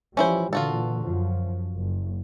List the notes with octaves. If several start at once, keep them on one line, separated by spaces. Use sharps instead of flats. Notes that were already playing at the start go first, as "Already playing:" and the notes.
E3 F3 G3 C#4 E4 C5
A#2 D3 E3 F4 F#4 A4
F#2 F3
F#1